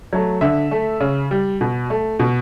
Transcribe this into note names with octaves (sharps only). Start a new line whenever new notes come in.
F#3 A3
D3 E5
A3
C#3
G3
B2
A3
B2